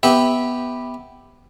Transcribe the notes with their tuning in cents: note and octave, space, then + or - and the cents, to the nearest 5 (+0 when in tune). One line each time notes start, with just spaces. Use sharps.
B3 +0 G4 +0 E5 -15